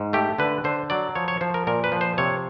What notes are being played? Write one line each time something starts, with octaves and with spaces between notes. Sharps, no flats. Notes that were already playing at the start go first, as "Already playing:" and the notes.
Already playing: G#2
A3 G4
D3 B4
D3 C5
F#3 D5
F3 C#5
C#5
F3 C5
A#4
A#2 A#4
B4
F3
C5
C3 C#5